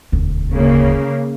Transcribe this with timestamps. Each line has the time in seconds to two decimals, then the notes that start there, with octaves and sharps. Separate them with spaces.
0.12 E1 D2
0.53 C#3 A#3